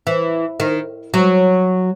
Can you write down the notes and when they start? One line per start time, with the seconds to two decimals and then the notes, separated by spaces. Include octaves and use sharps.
0.07 E3
0.60 D#3
1.14 F#3